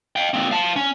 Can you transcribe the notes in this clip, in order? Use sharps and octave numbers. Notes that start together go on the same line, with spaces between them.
F5 G5
A#3 C4
F5 A5
C#4